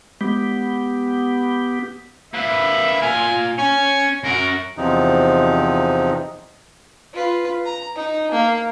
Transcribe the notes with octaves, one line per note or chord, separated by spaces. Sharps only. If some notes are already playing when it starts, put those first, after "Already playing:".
G#3 B3 G4
A#3 B4 E5
A#2 A#4 G#5
C#4 G#5
F#2 F#4 A#4
E2 C3 F3 D#4
F4 B4
A#5
D#4
A#3